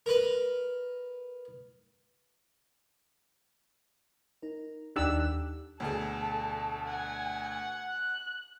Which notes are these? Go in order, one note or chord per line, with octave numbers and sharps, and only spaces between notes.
A#4 B4
D#4 A#4
D#2 D4 D#4 G4 E6 F#6
D2 B2 G#4 A4
F#5 G#5
F#6